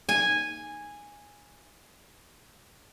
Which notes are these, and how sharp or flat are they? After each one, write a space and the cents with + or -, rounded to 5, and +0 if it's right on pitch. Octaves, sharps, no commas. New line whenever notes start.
G#5 -10